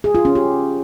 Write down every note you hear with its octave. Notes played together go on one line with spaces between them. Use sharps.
G#4
F4
C#4
G4